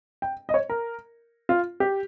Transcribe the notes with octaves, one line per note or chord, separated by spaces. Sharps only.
G5
D#5
C#5
A#4
F4
G4